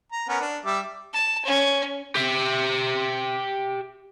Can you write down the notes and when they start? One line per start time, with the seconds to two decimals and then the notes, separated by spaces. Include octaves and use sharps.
0.12 A#5
0.29 B3 C#4 A#4
0.41 D4
0.66 G3 E5 D6
1.14 A5
1.45 C#4
2.15 G4 E5